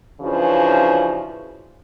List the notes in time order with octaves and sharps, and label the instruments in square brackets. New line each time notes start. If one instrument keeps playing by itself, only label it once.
[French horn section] C#3 E3 F3 C#4 D4 F#4